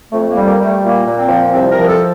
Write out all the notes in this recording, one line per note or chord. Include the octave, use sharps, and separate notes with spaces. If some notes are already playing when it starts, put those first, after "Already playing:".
F2 A3
A#3
G3
A#3
G3
A3
A#2 A#3
A#2
C4
F3
C2 C4
A#4
F3
A4